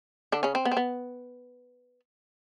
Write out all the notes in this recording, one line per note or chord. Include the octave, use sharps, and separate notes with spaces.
D3 D4
C#3 C#4
C4
B3
C4
B3